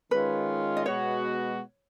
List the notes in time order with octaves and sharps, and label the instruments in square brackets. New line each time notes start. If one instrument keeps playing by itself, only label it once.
[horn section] D#3 G#3 C#4 F4 [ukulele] B4
[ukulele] D#5
[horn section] B2 G#3 B3 F#4 [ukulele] C#5